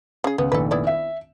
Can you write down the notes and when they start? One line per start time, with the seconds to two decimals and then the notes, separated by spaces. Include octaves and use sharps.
0.24 C#3 G#4
0.38 C#2 B3
0.52 F1 A#1 D#3 A4 B4
0.71 B3 E4 D5
0.87 E5